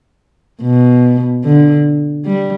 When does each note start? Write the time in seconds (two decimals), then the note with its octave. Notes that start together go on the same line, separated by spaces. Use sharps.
0.62 B2
1.44 D3
2.25 G3